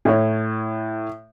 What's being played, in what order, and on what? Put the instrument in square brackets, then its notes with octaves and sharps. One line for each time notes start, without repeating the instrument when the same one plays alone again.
[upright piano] A2 C#5